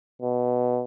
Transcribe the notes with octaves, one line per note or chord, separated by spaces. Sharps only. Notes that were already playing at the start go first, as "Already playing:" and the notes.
B2